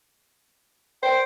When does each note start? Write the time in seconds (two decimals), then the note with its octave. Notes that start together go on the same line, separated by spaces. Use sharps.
1.03 C5 G5